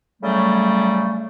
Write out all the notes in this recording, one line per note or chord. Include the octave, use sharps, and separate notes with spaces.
A2 C#3 F#3 G3 A3